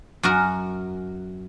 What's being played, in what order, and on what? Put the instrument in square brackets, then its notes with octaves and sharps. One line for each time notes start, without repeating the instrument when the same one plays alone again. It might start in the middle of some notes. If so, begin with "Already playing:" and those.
[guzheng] F#2 F#4 A#4